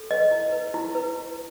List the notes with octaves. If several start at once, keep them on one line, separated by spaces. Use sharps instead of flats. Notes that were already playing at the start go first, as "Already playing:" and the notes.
Already playing: A4
B4 D#5
E4
B4
E4
B4
E4